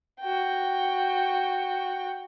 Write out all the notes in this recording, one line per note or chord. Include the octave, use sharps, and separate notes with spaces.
F#4 G5